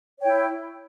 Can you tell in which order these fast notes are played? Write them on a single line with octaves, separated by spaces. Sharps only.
C#5 G5 E4